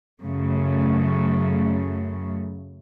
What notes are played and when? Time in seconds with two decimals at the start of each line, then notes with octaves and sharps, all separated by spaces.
0.23 F#2 C#3 A3